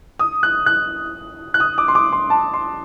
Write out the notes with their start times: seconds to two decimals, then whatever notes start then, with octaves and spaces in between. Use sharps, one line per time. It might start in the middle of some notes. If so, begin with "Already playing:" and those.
0.19 D#6
0.43 F#6
0.66 F#6
1.54 F#6
1.60 D#6
1.78 D6
1.88 C6
1.95 D6
2.12 C6
2.30 A5
2.54 C6